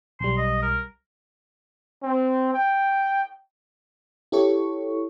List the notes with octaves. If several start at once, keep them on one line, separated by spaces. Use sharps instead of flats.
B1 G3 C6
D#5
A#4
C4
G5
E4 G4 A4 C#5 C#6